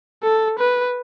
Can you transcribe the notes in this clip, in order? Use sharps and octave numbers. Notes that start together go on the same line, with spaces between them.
A4
B4